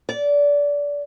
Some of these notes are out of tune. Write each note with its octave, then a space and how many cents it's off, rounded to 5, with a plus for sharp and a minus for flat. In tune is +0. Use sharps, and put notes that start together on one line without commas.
D5 -25